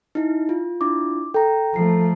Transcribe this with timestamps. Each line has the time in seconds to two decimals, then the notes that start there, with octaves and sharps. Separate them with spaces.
0.15 D#4 E4
0.49 F4
0.81 D4 E4 F4 D6
1.34 A4 G5 A#5
1.74 F3 A3 A#5 C7